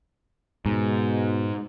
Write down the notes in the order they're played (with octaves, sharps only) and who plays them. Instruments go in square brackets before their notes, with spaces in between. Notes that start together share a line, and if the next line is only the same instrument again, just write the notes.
[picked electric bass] G#2 [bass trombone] B2